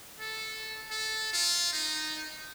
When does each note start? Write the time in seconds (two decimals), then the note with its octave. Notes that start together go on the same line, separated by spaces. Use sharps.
0.20 A4
0.91 A4
1.33 F4
1.73 D#4